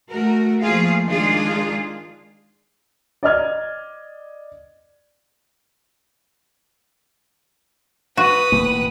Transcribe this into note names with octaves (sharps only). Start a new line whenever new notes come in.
A3 F#4 A#4
F3 A3 A#3 F4 G#4 F5
D#3 G#3 D4 F4 G#4
D5 D#5 F6 G#6
F#4 B4 D#6
E1 A2 A#3